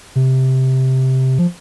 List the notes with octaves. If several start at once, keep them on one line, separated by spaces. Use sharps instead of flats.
C3
F3